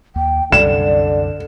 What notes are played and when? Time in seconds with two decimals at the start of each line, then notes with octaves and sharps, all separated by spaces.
0.16 D#2 G5
0.52 C2 F#2 D3 G3 D5 E7